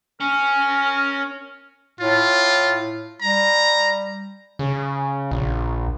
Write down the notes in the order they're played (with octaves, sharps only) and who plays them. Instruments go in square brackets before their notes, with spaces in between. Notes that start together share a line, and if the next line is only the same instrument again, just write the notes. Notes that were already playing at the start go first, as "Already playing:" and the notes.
[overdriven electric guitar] C#4 [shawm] A#4
[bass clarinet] A2 [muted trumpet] F4
[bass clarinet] G3 [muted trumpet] A#5
[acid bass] C#3
A#1